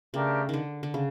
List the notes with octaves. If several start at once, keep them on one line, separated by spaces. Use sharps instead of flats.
C#3 A3 D4 G4 A#4
D3 D#3
D3
C#3